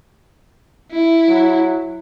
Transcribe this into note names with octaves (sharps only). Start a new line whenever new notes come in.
E4
F#3